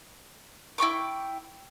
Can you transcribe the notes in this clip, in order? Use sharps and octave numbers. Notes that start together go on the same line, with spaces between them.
E4 G5 C#6 D6